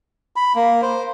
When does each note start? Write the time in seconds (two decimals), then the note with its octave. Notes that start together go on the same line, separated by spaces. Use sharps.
0.36 B5
0.56 A#3
0.82 C5